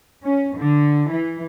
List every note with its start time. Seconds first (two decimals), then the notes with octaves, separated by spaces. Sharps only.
0.23 C#4
0.57 D3
1.10 E3